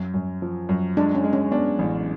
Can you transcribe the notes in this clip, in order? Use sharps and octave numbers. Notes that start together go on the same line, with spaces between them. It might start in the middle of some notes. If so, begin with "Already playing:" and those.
Already playing: F#2
F#2
F3
F#2
G#3 D4
C#4
G#3
C#4
B3 D4
A1